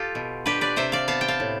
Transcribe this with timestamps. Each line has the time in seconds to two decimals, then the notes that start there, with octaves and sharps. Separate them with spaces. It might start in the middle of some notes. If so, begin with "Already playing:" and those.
Already playing: F4 G4 A4
0.15 B2
0.46 D4 G4 B4
0.61 B4 D5
0.76 C3 C5 E5
0.92 D5 F5
1.08 B3 F5 A5
1.21 G5
1.28 F5 A5
1.40 A2